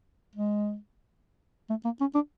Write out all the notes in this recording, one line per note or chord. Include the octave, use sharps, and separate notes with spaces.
G#3
A3
A#3
C#4
D4